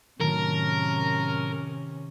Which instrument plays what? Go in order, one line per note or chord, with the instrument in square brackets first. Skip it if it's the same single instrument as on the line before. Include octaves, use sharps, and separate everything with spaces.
[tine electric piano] A2 F#3 A5 [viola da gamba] C3 C#4 [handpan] D#3 [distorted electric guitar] A#4